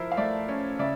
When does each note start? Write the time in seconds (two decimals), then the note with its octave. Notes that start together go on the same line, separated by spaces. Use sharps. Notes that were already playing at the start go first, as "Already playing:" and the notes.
Already playing: F3 E4 A#4 C5
0.12 F5
0.17 A3 D5 E5
0.48 C#4
0.79 C#3 D5 E5